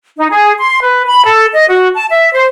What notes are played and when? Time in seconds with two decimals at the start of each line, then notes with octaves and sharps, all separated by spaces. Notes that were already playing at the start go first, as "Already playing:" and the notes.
0.17 D#4
0.30 G#4
0.57 C6
0.82 B4
1.08 B5
1.24 A4
1.52 D#5
1.68 F#4
1.94 A5
2.09 E5
2.34 C5